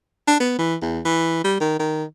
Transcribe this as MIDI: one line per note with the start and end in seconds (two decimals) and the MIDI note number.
0.28 0.37 62
0.40 0.56 59
0.59 0.75 52
0.82 1.00 40
1.05 1.41 52
1.44 1.57 55
1.61 1.76 51
1.79 2.04 51